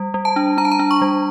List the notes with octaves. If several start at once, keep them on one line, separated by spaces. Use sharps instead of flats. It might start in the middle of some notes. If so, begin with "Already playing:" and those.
Already playing: G3
G3
A5
D4
D4 A#5
A5
A#5
D4
C#6
G3